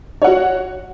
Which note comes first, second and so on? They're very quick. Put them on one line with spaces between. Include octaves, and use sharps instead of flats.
C#5 F#5 F#4